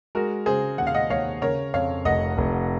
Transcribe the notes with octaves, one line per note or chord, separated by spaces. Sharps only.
G#3 F#4 A#4
C#3 G#4 C5
D#2 F#5
F5
D#5 F#5
D#2 C#5 F5
C#3 A#4 C#5
F2 C#5 F5
F1 D#5 F#5
F1